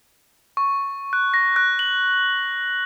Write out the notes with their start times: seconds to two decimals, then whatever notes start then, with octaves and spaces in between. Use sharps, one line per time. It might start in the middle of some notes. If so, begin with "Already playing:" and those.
0.57 C#6
1.13 F#6
1.34 A#6
1.56 F#6
1.79 F#7